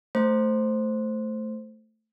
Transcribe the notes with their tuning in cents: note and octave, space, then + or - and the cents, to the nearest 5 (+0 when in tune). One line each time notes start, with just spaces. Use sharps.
A3 +0 C5 +0